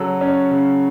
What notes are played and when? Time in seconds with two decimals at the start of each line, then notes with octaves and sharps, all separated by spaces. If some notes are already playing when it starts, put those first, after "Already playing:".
Already playing: C#3 F#3 A4
0.21 C#4
0.51 C#3